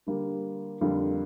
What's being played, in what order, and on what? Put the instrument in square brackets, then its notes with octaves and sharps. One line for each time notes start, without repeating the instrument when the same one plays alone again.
[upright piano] D3 G3 A#3
F2 D3 G3 A#3 F4